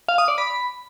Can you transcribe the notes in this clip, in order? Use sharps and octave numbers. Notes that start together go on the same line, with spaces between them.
F5
D#6
D5
B5